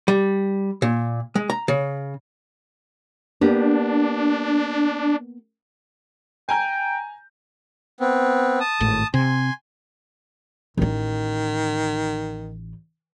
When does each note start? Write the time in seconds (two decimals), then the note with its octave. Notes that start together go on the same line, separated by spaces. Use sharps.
0.08 G3
0.82 A#2
1.35 G#3
1.50 A#5
1.68 C#3
3.41 A#3 B3 D4 G4
6.49 G5 G#5 A#5 G6
8.00 B3 C4
8.60 A5 D#6
8.81 G#1 A2
9.14 C3 G#5 C6
10.77 A1 D#3 D#4